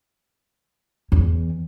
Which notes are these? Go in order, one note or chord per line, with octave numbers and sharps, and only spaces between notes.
E2